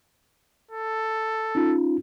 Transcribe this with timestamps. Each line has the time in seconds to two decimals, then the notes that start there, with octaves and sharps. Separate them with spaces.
0.71 A4
1.55 C#4 D#4 F4